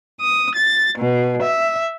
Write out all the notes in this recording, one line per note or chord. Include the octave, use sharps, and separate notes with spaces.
D#6
A6
B2
E5